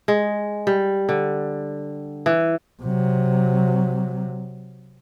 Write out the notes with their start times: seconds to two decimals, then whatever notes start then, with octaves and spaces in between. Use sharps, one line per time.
0.08 G#3
0.67 G3
1.09 D3
2.26 E3
2.83 C3 F#3